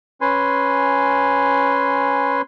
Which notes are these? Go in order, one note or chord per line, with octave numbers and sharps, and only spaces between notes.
C#4 B4 G#5 C6